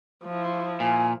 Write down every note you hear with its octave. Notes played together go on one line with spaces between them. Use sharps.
F3 E4
A#2 G#5